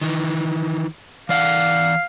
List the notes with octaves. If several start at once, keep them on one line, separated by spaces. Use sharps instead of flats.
D#3 E3
E3 D5 F5 F#5